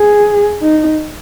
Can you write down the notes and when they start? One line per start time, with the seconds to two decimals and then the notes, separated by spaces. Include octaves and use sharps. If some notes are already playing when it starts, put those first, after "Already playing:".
Already playing: G#4
0.62 D#4